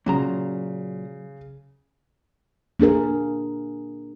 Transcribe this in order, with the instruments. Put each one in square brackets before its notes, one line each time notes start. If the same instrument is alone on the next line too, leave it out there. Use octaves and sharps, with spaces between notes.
[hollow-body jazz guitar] A#2 F#3 A#5 [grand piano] C#3
[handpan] A#3 D4 G#4 A#4